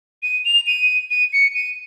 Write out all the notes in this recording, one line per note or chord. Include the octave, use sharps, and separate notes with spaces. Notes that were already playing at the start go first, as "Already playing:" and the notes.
D#7
F7
D#7
D#7
C#7
D#7